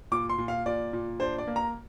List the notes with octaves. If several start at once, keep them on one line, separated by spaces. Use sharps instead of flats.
A#2 D6
C6
A#2
F5
A#2 D5
A#2
D4 C5
D5
A#3
A#5